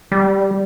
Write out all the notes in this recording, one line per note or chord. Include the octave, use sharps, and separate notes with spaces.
G3